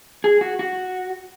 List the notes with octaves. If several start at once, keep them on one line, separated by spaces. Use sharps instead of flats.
G#4
F#4
F#4